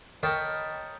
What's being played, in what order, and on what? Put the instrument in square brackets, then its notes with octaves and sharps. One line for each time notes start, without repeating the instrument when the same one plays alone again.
[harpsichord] A#4 C#5 D#5 G5 A5 B5